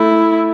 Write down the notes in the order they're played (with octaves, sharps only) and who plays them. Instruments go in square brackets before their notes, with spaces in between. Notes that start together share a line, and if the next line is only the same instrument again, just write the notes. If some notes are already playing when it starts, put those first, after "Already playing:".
Already playing: [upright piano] A3 [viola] E4